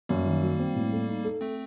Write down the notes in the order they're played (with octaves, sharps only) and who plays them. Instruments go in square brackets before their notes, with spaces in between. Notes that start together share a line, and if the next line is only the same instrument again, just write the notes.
[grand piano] F#2 [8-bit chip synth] G3 A#3
[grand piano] D#3
F#3
C4
A2
A3
D#4
A4
[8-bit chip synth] A3 C4